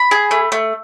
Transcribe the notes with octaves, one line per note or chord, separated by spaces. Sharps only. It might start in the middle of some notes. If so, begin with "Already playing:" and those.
Already playing: B5
G#4
A3
A3